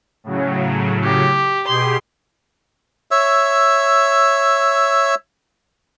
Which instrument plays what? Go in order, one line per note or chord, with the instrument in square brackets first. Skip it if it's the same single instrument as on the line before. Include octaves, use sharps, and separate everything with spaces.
[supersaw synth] A2 C#3 F#3
[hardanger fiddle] G4
[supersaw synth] B2 G4 G#4 [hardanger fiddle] C6
[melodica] C#5 E5 E6